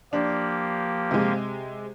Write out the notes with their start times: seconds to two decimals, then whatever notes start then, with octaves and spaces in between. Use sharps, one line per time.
0.13 F3 A#3 D4 G4
1.11 C3 G#3